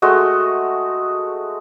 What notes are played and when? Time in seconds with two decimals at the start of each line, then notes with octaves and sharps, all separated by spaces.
0.02 G#3 A3 F#4 D#5